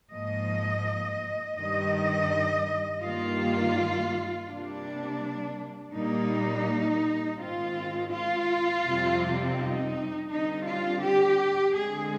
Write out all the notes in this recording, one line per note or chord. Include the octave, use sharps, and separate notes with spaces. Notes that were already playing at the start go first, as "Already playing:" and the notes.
G#2 F3 A#3 D#5
G2 D#3 G3 D#5
G2 D#3 G3 A#3 F4
C3 G3 A#3 D4
A#2 G3 A#3 D#4
G#2 D#3 G#3 C4 F4
F4
F2 C3 G3 C4
D#4
D3 G3 C4 D#4
F4
G4
D3 G#3 C4 G#4